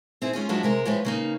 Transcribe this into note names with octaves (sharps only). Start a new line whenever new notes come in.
C4 E4 G#4
G#3 C#4 F4 G#4
F3 F#3 G#3 D4 E4 F#4
C3 G#3 A#4
A2 F3 G#3 C#4 B4
C#3 A#3 D#4